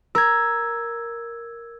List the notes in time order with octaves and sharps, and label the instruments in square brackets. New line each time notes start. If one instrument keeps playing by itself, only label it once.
[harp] A#4 [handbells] E6 G#6